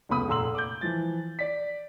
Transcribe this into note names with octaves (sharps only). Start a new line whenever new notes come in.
F1 C#2 B3 B5 D#6
F1 A#2 A#5 C6 E6 F#7
D6 G6
E3 F3 A6
D5 B6